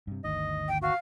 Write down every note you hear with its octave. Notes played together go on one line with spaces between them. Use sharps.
G2 C3
G1 D2 D#3 D#5
G5
F#4 F5